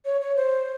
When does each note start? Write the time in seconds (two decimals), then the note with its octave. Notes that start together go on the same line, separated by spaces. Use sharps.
0.05 C#5
0.21 C#5
0.36 C5